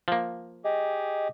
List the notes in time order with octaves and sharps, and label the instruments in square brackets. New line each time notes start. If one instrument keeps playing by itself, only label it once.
[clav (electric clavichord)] F3 A#3
[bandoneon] G4 G#4 [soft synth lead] D#5